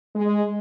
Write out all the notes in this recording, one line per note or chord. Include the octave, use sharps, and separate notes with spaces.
G#3